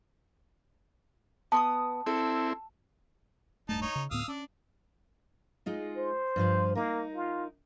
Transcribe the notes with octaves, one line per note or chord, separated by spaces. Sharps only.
B3 A5 C6 D#6
C4 E4 A4
D1 G2 A3 D#4 A5
D#4 C#5
C#3
D2 A2 B3 F5 D#6 E6
C#4 D4
G#3 D#4 F4
C5
G2 F3 B4
A#3 D#4 A#4
F4